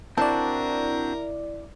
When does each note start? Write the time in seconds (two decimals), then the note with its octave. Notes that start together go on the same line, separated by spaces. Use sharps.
0.18 C4 D4 E4 F#4 A#4 D5 A5